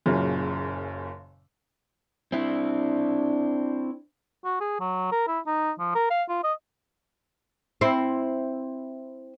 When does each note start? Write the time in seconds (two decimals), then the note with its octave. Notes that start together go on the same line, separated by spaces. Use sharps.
0.06 F#1 F#2 A#2 C#3
2.32 C4 D4 E4
4.44 F#4
4.61 G#4
4.80 F#3
5.12 A#4
5.27 E4
5.47 D#4
5.79 F3
5.95 A#4
6.10 F5
6.29 F4
6.44 D#5
7.81 C4 E4